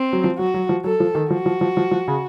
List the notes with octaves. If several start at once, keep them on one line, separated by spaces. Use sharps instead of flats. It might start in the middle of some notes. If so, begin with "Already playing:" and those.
Already playing: C4
F#3
F3
F#3 F#4
F#3
F3
F#3 A4
F3
D#3
F3 F#4
F3
F3
F3
F3
C#3